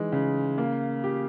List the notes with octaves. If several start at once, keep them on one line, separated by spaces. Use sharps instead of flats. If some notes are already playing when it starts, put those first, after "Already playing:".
Already playing: E3 G#3 D#4
C#3
A#3
G4